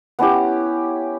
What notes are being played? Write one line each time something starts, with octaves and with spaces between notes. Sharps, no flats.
B3 C#4 E4 G4